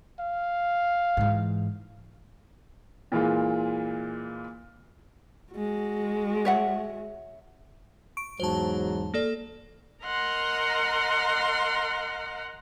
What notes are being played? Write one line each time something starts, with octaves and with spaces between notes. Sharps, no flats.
F5
G#2 E3
A#2 E3 G#3 F4
G#3 F#4
C#5 E5 F#5
C#6 D7
E2 G#2 F#3 C5 A5
A#3 A4 D5
A#4 D#5 F#5 A#5 C6